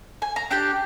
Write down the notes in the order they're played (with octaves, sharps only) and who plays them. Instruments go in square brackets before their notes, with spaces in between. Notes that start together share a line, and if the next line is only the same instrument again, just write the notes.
[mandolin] G#5
A#5
D4 G4 G5